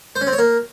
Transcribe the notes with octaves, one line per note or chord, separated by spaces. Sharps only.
C5
C#4
C4
C#5
A#3